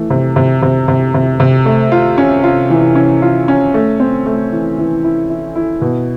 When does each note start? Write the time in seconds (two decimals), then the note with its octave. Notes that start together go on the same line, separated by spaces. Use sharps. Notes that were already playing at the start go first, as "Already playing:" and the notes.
Already playing: E3 A3
0.10 C3
0.36 C3
0.62 C3
0.88 C3
1.14 C3
1.40 C3
1.65 A3
1.92 F4
2.18 C#4
2.44 F4
2.70 E3
2.95 C#4
3.22 F4
3.48 C#4
3.74 A3
4.00 C4
4.26 A3
4.52 E3
4.78 E3
5.04 E4
5.30 E4
5.55 E4
5.81 B2